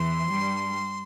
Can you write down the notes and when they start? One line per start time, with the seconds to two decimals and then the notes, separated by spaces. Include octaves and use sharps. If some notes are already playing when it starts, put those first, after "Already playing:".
Already playing: E2 E3 C6
0.29 G2 G3